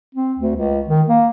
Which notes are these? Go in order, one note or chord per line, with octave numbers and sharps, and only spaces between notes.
C4
D2
C#2
D#3
A#3